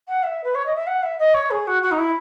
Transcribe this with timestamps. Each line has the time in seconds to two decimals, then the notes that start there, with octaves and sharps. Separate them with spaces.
0.08 F#5
0.23 E5
0.43 B4
0.54 C#5
0.65 D#5
0.75 E5
0.86 F#5
1.02 E5
1.19 D#5
1.34 C#5
1.50 G#4
1.67 F#4
1.82 F#4
1.91 D#4
1.98 E4